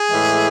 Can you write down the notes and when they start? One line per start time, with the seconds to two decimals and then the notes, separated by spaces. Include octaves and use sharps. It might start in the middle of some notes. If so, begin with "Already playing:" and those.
Already playing: G#4
0.11 A2 E3 G#3